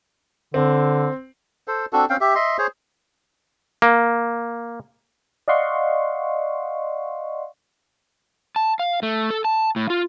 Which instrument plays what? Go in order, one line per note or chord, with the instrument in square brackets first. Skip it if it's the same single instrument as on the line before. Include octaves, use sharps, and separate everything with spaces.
[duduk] D3 [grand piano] C4
[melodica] A4 C5
C4 D4 F#4 A4
C4 C#4 F5 G5
G4 E5
D#5 E5 C6
G#4 C5 C#5
[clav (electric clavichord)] A#3
[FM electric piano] D5 D#5 F5 F#5 C6 C#6
[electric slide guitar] A5
F5
A3
A4
A5
A2
F4